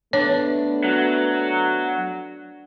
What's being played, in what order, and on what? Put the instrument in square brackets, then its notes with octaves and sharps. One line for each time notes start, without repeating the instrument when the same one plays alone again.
[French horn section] A3 B3 [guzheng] D4 [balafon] C#5
[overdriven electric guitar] F#3